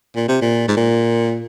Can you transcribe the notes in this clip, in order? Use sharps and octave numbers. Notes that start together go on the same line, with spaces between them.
A#2
C3
A#2
G#2
A#2